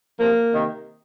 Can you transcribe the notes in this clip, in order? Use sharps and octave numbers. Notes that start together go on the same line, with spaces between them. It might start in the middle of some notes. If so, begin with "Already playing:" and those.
C3 F3 A#3
C3 D#3